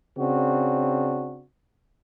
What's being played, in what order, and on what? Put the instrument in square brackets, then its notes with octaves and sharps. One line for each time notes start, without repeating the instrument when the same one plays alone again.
[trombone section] C#3 C4 D4 F#4